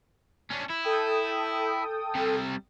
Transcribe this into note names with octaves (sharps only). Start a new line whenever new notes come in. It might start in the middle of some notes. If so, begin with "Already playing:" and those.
C#4 D4
E4
A4 G5 D#6
C3 G3